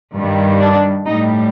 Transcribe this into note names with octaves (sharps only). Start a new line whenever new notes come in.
G2 D#3 G3
D4
A2 G3 D#4